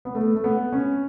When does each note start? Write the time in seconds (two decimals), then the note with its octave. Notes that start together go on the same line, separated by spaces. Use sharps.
0.05 B3
0.15 A3
0.35 A3
0.44 B3
0.72 C#4